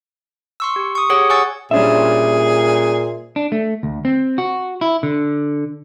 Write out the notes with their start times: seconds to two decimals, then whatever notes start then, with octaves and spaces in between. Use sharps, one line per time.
0.60 C6 C#6 E6
0.76 G4
0.95 C#6 D#6
1.10 G4 G#4 C#5 F#5 C#6 D#6
1.29 C#5 F#5 G#5 C#6 E6 A6
1.71 A#2 G3 C#4 D4 G#4 C5 E5
3.36 D4
3.52 A3
3.83 D2
4.05 C4
4.38 F#4
4.81 E4
5.03 D3